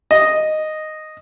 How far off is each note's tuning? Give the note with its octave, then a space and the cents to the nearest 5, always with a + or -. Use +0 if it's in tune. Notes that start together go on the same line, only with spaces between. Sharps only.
D#5 -5